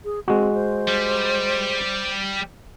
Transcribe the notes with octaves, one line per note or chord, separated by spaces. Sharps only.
G#4
G#3 C4 F#4
C5
G3